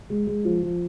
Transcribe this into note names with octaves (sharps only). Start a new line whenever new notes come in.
G#3
G#3
F3
F3